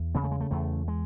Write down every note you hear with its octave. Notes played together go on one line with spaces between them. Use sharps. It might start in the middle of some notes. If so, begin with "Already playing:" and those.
Already playing: E2
C#3 B3
A3
G#3
A3
E2 A3
G#3